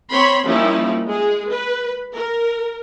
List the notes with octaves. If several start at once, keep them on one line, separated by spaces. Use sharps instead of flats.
C4 C#5 B5 C6
F3 G3 A#3 C#4 D#4 E4
G#3 G#4
B4
A#4